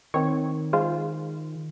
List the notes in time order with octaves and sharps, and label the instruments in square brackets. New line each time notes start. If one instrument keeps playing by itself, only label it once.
[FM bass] D#3 [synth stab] C4 C#5
[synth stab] G#3 F4 C5